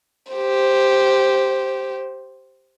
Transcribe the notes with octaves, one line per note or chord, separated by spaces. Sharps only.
G4 C5